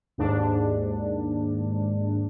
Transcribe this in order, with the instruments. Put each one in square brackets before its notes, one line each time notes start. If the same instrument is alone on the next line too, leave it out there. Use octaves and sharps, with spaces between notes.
[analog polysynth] D#2 G#2 D4